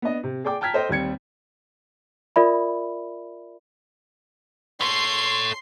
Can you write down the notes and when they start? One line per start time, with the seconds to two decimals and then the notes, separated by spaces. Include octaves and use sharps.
0.02 B3 D4 D#5
0.24 C3
0.44 G#4 D5 G5 D6
0.61 G5 A5 A#5 F6 G#6 B6
0.73 A4 C5 D#5 G5
0.89 D#2 G3 C4 G#6 C#7
2.36 F4 A#4 D5 E5 B5
4.81 A4 C#5 C6 C7